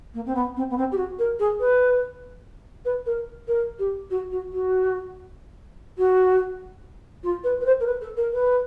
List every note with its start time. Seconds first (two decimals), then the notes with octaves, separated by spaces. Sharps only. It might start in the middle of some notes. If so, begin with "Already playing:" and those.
0.14 A#3
0.25 C4
0.34 B3
0.56 C4
0.70 B3
0.77 C4
0.91 G4
0.97 F#4
1.18 A#4
1.39 G#4
1.60 B4
2.85 B4
3.06 A#4
3.47 A#4
3.78 G4
4.10 F#4
4.31 F#4
4.52 F#4
5.98 F#4
7.23 F4
7.43 B4
7.60 B4
7.65 C5
7.80 A#4
7.86 B4
8.01 A4
8.16 A#4
8.32 B4